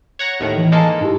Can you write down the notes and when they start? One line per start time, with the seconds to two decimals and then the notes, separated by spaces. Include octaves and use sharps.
0.19 C#5 F#5 A#5
0.40 D#2 A2 D#3
0.57 E3
0.72 G#3 A#3 A4 D#5 A5
1.00 G2 D#4 E4 G4